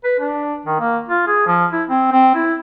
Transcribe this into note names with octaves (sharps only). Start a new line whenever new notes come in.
B4
D4
D#3
A#3
F4
G#4
F3
E4
C4
C4
E4